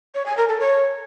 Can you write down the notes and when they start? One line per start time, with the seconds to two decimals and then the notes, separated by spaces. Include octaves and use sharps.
0.14 C#5
0.26 G#5
0.37 A#4
0.49 A4
0.60 C#5